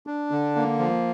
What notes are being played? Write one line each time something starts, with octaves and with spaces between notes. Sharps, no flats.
D4
D3
A#3
F3